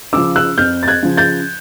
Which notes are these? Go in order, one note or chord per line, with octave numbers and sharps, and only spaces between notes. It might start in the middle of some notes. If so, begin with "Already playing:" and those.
C#3 F3 D6 E6
E6 F#6
F2 F6 G6
A6
F#6 G#6
C#3 F3
G6 A6